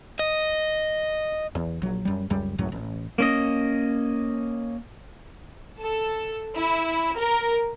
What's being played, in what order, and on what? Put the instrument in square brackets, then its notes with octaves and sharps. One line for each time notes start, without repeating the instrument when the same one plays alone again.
[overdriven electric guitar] D#5
[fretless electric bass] E2
A#1 F#3
F#2 G3
C#2 F#2 G3
C#2 F#2 A2 F#3
A1
[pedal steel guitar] A#3 C#4 D#5
[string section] A4
E4
A#4